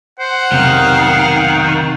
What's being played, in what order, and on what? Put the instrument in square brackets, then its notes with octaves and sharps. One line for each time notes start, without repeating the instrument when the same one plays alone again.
[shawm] C5 [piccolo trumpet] F#5
[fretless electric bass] F1 B1 C3 [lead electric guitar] D#3 [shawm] F5